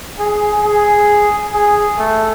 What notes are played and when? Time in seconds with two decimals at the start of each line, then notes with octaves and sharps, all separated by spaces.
0.18 G#4
0.64 G#4
1.54 G#4
1.98 A3